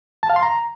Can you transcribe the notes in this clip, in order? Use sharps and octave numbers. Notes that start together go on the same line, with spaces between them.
A5
F5
C6
A#5